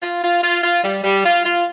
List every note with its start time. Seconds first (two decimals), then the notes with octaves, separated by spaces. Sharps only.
0.02 F4
0.23 F4
0.42 F4
0.63 F4
0.83 G3
1.04 G3
1.24 F4
1.44 F4